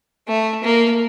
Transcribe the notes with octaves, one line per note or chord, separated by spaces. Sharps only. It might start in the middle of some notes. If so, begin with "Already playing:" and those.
A3
A#3